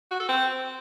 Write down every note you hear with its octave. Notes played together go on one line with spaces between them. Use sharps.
F#4
A4
C4